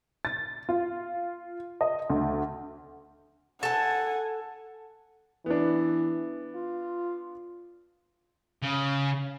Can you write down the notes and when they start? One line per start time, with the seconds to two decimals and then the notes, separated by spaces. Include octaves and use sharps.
0.25 A6
0.69 F4
1.81 D#5
2.10 D2
3.63 A4 F#5 G#5 A5
5.46 E3 B3 D4
6.55 F4
8.62 C#3